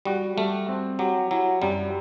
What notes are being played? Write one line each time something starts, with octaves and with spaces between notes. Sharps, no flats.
G3 F#4
G3 A3
C4
F#3 G4
F#3 E4
F#2 G3